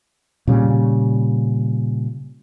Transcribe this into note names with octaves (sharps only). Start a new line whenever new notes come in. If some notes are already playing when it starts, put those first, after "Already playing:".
A#2 C#3 G3